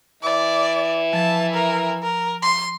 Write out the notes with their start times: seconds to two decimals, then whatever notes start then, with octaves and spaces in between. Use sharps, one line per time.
0.23 E3 D5 E5
1.13 F3 A5
1.54 A#4
2.03 A#4
2.42 C6